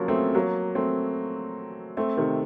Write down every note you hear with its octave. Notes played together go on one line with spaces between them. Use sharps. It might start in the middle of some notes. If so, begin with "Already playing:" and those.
Already playing: C#3 F3 F#3 A#3
A3 C4
F#3 A#3
A3 C4
A3 C4
C3 D#3